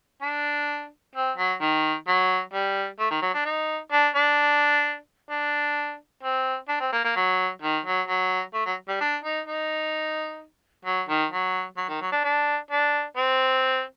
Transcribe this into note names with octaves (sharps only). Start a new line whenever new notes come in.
D4
C4
F#3
D#3
F#3
G3
A3
D#3
F#3
D4
D#4
D4
D4
D4
C4
D4
C4
A#3
A#3
F#3
D#3
F#3
F#3
A3
F#3
G3
D4
D#4
D#4
F#3
D#3
F#3
F#3
D#3
F#3
D4
D4
D4
C4